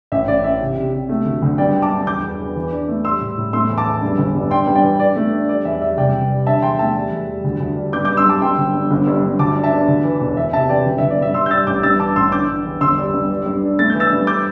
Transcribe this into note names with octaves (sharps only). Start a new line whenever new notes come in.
A1 E5
A1 D5
A1 E5
C3
C3
C3
A3
D2
D2
G2 D5 G5
D3
A5 D6
G2
E2 D6 G6
E2
E2
E3
D4
A3
G3 C6 E6
A2
A2
A3 C6 E6
E2
A5 D6
E2
G2
G1
G2
D4 G5 C6
G2
D5 G5
E3
D4 D5
A3
D4
G3 D5
E2 E5
G3 E5
C2 D5 G5
C2
G3
D3 E5 A5
E2 G5 C6
A3 E5 A5
G3
E2
G3
D2
D2
G3
G2 D6 G6
G2 D6 G6
C6 E6
G2 A5 D6
G2 G5 C6
G1
G2
G1
G2
G2
D2 A5 D6
D4
E5 A5
D4
D2
E3
E1
E3 E5
C3 E5 A5
E3 D5 G5
G1
G1 E5
D5
G2 E5
G3 C6 E6
G6
G3 E6 A6
A1 D6 G6
G2 E6 A6
E3 A5 D6
A1 C6 E6
D3 D6 G6
D3
E2
G1 C6 E6
G3
G2
G3
G2
D4
A3 A6
E3 G6
E6 A6
G2
D6 G6